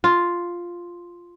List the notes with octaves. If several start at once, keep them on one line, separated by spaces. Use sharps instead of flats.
F4